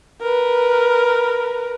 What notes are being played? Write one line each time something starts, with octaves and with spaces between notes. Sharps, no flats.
A#4 B4